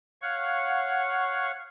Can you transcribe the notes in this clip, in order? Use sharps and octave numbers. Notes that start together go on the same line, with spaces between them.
C#5 F5 F#5 C#6